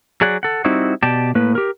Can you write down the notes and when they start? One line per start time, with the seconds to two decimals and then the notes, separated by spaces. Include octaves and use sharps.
0.21 F#3 G#4 D5 F#5
0.43 A4 F#5
0.65 G3 C4 D#4 E4 F#4
1.03 B2 G4 D5 G5 A5
1.35 A2 A#3 B4
1.55 G4 A#4